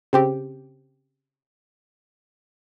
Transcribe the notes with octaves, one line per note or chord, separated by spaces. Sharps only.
C#3 C4 G4